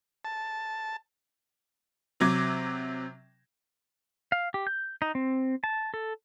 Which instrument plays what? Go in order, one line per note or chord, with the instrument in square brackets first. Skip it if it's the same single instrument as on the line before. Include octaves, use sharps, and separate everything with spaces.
[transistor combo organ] A5
[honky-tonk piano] C3 F#3 D6 G#6
[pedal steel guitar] F5
G4
G6
D#4
C4
A5
A4